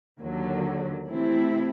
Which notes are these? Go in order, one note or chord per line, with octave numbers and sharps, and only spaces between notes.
D#2 D3 F#3
C3 E3 A3 C4 E4